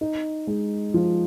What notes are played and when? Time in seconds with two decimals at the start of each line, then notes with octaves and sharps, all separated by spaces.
0.01 D#4
0.47 G#3
0.94 F3